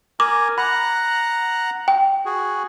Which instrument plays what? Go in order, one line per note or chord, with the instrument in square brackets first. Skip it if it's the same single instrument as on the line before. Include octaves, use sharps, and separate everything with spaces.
[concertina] A#4 G#5 [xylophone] D6
[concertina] F#5 A#5 F#6 [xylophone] B5
[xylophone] G5
[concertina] F#4 G#4